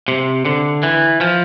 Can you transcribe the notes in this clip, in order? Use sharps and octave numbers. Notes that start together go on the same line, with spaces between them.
C3
D3
E3
F3